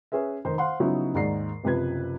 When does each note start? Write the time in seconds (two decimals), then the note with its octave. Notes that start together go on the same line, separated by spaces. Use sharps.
0.12 C#4 G#4 B4 E5
0.45 F1 D#3 C5
0.58 C5 F5 F#5 C6
0.80 C#3 F3 F#3 B3 D#4 E4
1.15 D#2 G#2 G#3 D5 A#5 C7
1.64 F#1 C3 F3 B4 G#6